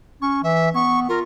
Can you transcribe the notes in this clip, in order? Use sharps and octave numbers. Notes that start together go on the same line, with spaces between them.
C#4 C#6
E3 E5
B3 C#6
F4 A#4